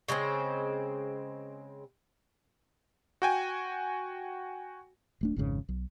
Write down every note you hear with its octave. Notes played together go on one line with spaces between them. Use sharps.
C#3 G#3 A3 C4
F#4 G5 G#5
D1 A3 D4
G#1 F2 G#2 C#3
B1